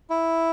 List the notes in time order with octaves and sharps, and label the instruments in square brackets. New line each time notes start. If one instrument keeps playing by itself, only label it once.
[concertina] E4